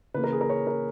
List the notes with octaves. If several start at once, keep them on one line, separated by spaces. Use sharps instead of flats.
C#3 E3 A#3 B4
A#4
G#4
A#4
C#5
A#4